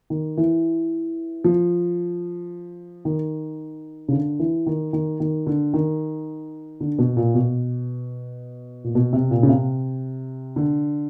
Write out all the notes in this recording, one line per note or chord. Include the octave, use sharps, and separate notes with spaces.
D#3
E3
F3
D#3
C#3
D3
E3
D#3
D#3
D#3
D3
D#3
D3
B2
A#2
B2
A#2
B2
C3
A#2
C#3
C3
D3